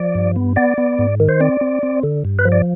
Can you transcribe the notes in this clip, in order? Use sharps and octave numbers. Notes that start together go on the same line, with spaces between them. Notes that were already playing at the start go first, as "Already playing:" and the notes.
Already playing: F3 D5
G2
B3
B3 D5
B3
G#2
D#3
C5
C4 D5
C4
C4
D3
G2
B4
F3
D5